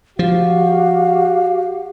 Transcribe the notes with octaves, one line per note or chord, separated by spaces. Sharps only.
F3 F#4 G4 F5